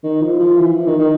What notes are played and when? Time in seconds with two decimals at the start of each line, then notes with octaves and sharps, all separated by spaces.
0.03 D#3
0.21 F3
0.39 F3
0.56 E3
0.75 F3
0.87 D#3
0.99 D#3